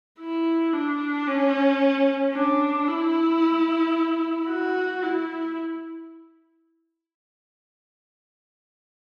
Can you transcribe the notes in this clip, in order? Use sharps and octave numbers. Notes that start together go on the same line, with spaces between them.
E4
D4
C#4
D4
E4
F#4
E4